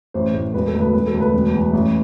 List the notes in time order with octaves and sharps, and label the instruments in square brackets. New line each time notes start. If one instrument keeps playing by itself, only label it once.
[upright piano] A1 C5
A2
E1 B4
A4
D2
B4
E1 B4
A4
D2
B4
E1
E2
A1